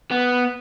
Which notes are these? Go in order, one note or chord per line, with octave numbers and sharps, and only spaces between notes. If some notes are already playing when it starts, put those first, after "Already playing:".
B3